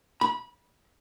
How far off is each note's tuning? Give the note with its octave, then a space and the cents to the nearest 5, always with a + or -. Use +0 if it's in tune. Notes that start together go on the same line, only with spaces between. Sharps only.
B5 -25